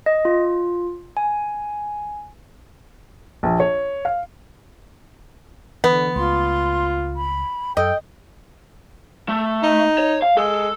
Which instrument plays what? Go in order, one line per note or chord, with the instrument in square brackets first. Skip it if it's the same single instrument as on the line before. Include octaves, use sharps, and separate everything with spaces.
[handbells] D#5
F4
G#5
[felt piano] A#1
C#5
F5
[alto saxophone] D3 [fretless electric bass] E3 [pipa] B3
[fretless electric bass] C#2 G#3 A3 [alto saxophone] F4 [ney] C6
[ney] B5
[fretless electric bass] F#2 [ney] A4 [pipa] D#5 [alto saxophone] G5
[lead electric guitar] A3
[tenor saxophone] D#4
[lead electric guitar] C#5
F5
[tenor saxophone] G#3 [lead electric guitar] A4